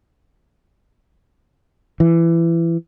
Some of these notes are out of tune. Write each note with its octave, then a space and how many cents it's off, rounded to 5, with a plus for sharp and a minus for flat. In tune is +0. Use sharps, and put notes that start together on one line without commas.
E3 +20